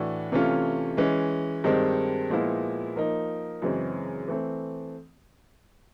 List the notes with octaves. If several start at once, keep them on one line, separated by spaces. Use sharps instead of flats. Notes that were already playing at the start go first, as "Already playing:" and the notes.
Already playing: A2 E3 A3 D4 F#4
C3 E3 A3 C#4 F4
E3 G#3 C#4
G2 D#3 G#3 C4
A#2 F3 G#3 B3 E4
F3 A#3 D#4
F#2 C#3 E3 G#3 C4
E3 A3 C4